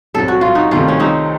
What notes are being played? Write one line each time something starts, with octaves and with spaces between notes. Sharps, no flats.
C2 C3 F#3 A4
F#4
F4
D#4 F#4
C2 C3 D#3 A3 C#4 F4
C#4
C4 D#4